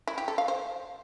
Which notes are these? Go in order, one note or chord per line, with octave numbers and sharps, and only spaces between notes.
E4
G4
A4
F5
C5